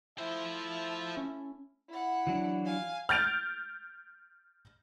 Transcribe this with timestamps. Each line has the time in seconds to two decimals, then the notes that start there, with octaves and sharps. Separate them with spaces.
0.18 F3 A3 E4 C5 E5 A5
1.17 C#4
1.89 E4 F#5
2.27 E3 F#3 D4
2.65 F5 G#5
3.09 F6 G6 A6 D7 F7